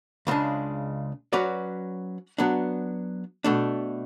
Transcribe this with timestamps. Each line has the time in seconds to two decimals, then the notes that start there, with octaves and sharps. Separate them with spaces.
0.27 C#2 C#3 G#3 D4
1.33 F#3 C#4 F#4 B4 D5
2.38 F#3 B3 D4
3.44 B2 A3 D4